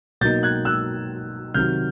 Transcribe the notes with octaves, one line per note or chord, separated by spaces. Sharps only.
B2 F#3 A#3 D#4 G6 A6
F#6 G#6
E6 F#6
C3 D#3 F#3 F6 G6